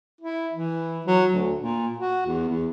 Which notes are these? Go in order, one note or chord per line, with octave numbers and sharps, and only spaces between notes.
E4
E3
F#3
D2
A#2
F#4
E2
E2